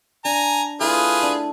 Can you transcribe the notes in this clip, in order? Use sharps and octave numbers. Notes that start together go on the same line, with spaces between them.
D4 G#5 A#5
A3 E4 F4 G#4 B4 E5
D4